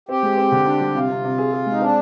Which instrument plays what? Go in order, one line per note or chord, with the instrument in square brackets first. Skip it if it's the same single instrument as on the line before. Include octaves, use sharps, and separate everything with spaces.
[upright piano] C4 [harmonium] G4
[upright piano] G#3
C4
D3
D4
G3
[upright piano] C3 [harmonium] F4
[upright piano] C3
C3
G#4
G#4
[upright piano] G#3 [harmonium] D#4
[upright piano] C4 [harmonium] D4